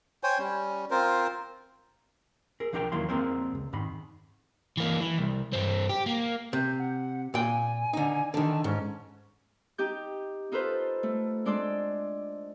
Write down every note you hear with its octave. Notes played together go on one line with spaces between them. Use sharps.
C5 C#5 G5 G#5
G3 C#4
C4 F4 A#4 C5
G#4 A#4
B1 F3 D4 A#4 C#5 G5
E2 D#3 F#3 A#3 E4 C6
F2 G#3 A#3 C4 A#4 C5
C#2
F2 G#2 D#3 B5
E3 A#3
E3
C2
G2 C4
G4
A#3
C3 G6
F#5
A#2 G5 G#5
D3 D#4
D3 D#3 A5
G#2 C#4
D#4 G4 G6
D#4 F4 A4 B4 C5
A3
G#3 D4 D5 C6 E6